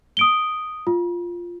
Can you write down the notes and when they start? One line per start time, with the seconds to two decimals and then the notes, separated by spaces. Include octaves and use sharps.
0.17 D#6 D7 G7
0.87 F4